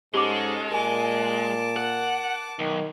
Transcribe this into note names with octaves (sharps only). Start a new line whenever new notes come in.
G#2 G#3 C#4 G4 A4 B5 D6
A#2 A#4 G#5 A5 D6
A#4 F#5
B1 D#3